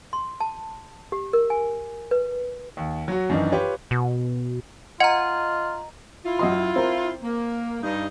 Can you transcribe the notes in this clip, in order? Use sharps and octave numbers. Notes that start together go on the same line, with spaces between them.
C6
A5
G4
A#4
G#5
B4
D#2
F#3 F#4
F#2 D#3 E3 D4 D#4
F4 G4 B4 C#5
B2
F4 D#5 F#5 A#5
E4 F4
F#2 D#5 C6
C4 A#4
A#3
G2 D#4